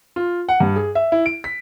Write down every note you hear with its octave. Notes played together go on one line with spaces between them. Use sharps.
F4
F#5
G2
G#4
E5
E4
D7
B6